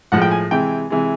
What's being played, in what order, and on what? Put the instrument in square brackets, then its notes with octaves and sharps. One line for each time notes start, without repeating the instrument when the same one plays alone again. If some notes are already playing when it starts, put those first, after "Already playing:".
[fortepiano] A2 F3 G#3 F#5
G5
G#5
C3 E3 G#3 G5
C3 E3 G#3